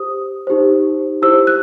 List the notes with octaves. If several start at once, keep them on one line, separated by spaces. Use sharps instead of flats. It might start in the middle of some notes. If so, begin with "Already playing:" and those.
Already playing: G4 C5 D#6
D#4 G4 C5
E4 G4 C5 E6
F#6